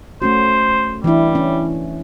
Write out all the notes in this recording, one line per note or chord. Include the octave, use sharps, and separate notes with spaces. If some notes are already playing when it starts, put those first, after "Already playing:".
A3 C#4 F#4 C5
E3 G3 D4 E4
C#4 E4